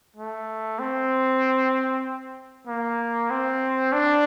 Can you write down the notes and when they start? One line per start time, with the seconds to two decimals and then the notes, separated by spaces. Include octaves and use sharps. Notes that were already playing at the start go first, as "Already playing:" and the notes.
0.16 A3
0.79 C4
2.67 A#3
3.31 C4
3.93 D4